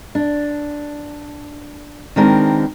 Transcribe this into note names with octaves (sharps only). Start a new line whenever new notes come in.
D4
D#3 G#3 B3 C4 D4 A#4